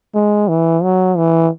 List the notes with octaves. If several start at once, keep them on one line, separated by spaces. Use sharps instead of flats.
G#3
E3
F#3
E3